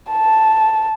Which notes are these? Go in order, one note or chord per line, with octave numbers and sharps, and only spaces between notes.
A5